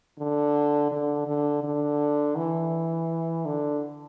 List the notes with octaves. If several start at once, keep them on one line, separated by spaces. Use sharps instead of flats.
D3
D3
D3
D3
E3
D3